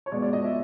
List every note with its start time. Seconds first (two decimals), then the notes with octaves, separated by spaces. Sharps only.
0.06 C#5
0.12 B2 G#3 B3 D5
0.22 D5
0.33 D#5
0.44 E5